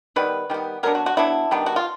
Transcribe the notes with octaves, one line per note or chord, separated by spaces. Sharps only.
D#3 G3 B3 B4
D#3 G3 B3
F#3 B3 D4 A#4
F#4
F#4
F#3 B3 D4 E4
D#3 G3 B3 D4
F#4
F4